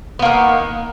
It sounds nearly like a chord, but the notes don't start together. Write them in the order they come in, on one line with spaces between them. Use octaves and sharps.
B3 A#3 D#3